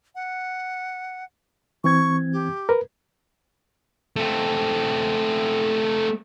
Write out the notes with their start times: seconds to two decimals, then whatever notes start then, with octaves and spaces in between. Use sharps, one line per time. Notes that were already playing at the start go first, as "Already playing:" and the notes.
0.15 F#5
1.84 E3 C4 C#6 G#6
2.32 G4
2.69 A#4 B4
4.16 A3 C4